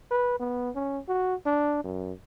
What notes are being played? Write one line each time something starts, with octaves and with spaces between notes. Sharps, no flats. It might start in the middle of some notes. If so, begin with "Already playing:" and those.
B4
B3
C#4
F#4
D4
F#2